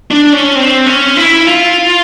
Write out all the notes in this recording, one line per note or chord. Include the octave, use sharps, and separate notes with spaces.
D4
C#4
C4
C#4
E4
F4